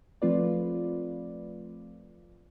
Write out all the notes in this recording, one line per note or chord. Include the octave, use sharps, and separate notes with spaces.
F3 A3 C4 F4 B4 D5